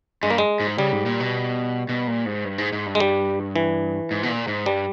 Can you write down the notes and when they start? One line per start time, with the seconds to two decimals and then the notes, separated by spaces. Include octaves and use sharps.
0.23 G2 G#3
0.30 A#3
0.38 G#3
0.60 G#2
0.78 C#3 G3
0.92 G#2
1.06 A#2
1.20 B2
1.89 B2
2.07 A#2
2.26 G#2
2.45 G2
2.58 G#2
2.73 G#2
2.86 G2
2.95 G#3
3.00 G3
3.56 E3
4.11 G#2
4.23 B2
4.29 A#2
4.48 G#2
4.66 G2 G3